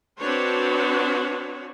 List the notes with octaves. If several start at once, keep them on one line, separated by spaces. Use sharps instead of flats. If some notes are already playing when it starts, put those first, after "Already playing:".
C4 D4 F#4 B4 C#5